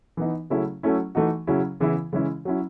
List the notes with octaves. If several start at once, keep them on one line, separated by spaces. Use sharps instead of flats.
E3 B3 D#4
C#3 F#3 A3 C#4 E4
F#3 A3 C#4 E4
E3 A3 D#4 F#4
C#3 F#3 C#4 E4
C#3 E3 B3 E4
C#3 E3 G#3 C#4 E4
F#3 C#4 E4